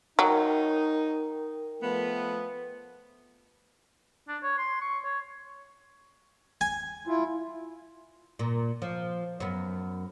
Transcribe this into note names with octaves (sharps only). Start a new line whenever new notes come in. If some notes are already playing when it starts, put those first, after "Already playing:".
F#3 D#4 A#4 G5
F3 A3 B3
D4
C#5
C6
C#6
C#5
G#5
E4 F4
A#2
F3
F#2 B3